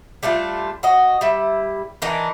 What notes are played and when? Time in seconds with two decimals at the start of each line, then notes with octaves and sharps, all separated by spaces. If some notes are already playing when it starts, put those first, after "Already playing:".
0.23 G3 A3 D4 F4
0.83 F#4 D#5
1.21 G3 E4
2.02 E3 D4 D#4 A#4